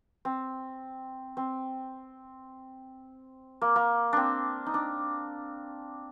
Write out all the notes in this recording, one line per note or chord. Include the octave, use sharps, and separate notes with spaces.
C4
C4
A#3
A#3
C4 D4
D#4
D4